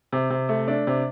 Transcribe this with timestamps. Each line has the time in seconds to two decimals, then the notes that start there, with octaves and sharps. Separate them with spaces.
0.13 C3
0.30 C3
0.49 A3
0.68 D4
0.87 C3